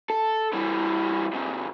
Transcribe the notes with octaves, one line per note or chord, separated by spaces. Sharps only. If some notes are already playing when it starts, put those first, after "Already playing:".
A4
E3 G3
G#2 C3